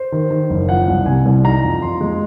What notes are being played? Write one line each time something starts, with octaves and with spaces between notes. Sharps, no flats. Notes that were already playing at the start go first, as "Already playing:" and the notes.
Already playing: C5
D#3
D#3
F#1
F3 F#5
C2
C3 G#5
C2
D#4 A#5
F2
F2 C6
G#3